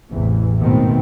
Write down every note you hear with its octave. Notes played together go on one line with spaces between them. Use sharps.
A1 E2 C3 E3
G#2 B2 D#3 A3 B3 C4